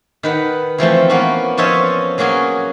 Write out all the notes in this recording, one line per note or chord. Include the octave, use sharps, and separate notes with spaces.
D#3 B4 F#5
E3 F3 A3 C4
A#3 B3 C#4 F#4
F3 C#4 F4 C#5 D#5 E5
F#3 A#3 C#4 F#4 G#4